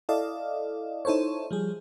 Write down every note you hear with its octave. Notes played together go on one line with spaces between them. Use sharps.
E4 A4 D5 D#5 F5
D#4 E4 A4 C5 C#5
F3 G3 G#4